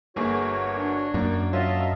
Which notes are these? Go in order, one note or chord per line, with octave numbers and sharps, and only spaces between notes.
G1 A#3 F#4 G#4 C#5
D4
F#2 A#3
F#3 F4 D#5 E5 A5